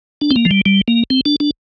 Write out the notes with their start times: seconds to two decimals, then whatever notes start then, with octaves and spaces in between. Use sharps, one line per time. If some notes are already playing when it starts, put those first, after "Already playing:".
0.21 D4
0.31 C4
0.36 A#3
0.45 F3
0.51 G3
0.66 G3
0.88 A#3
1.10 C4
1.25 D4
1.40 D4